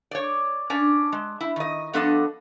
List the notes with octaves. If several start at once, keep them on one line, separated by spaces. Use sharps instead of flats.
C#5 D5
C#4 D4 D5
G#3
E4
D#3 D#5
G2 F3 B3 D4 A4 D#5